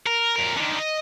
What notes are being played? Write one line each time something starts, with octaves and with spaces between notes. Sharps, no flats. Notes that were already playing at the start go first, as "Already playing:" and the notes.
A#4
F2 A#4
D3 D#3
D#5